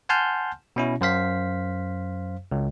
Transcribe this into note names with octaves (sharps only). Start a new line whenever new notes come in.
F#5 G#5 A5 C6 F6 G6
B2 C#4 E4
F#2 C5 F5 B6
C#2